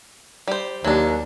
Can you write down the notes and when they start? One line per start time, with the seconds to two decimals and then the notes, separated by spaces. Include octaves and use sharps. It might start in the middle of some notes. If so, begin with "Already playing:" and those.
0.48 G3 C5
0.84 D#2 F#3 D4